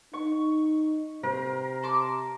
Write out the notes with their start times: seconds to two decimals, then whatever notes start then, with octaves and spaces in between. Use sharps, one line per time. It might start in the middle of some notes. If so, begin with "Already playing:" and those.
0.13 D#4 C#6
1.23 C3 A#4 C5
1.83 A5 C6 D6